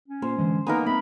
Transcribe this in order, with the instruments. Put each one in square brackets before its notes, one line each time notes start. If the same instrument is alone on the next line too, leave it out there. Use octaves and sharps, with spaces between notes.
[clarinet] C#4
[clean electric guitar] A#3 F4 [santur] C5
[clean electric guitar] D3 E3 G#3
[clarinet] A#3 [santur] B3 D#4 A#4 [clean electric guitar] B4 G#5
[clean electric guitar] A#3 C4 [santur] E5 [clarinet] B5